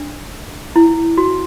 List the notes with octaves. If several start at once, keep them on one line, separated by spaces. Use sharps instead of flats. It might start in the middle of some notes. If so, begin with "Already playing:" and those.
Already playing: D4
E4
F#4